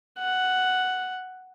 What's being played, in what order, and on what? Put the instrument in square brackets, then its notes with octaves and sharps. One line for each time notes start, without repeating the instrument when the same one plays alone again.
[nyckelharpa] F#5